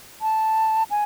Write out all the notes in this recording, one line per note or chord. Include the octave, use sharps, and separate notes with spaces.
A5
G#5